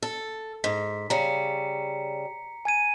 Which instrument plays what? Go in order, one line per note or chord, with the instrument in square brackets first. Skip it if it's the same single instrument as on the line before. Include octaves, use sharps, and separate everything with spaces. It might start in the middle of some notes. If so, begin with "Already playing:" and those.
[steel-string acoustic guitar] A4
[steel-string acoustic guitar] G#2 [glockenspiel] B6
[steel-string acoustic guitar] C#3 G3 [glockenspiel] A#5 C#7
[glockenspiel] G#5 G#6 D#7